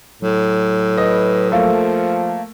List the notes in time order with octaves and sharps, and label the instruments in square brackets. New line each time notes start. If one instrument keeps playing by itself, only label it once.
[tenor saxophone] A2 [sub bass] F#3
[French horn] B4 [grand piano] D#5
[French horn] F3 [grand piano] A3 A#3 A4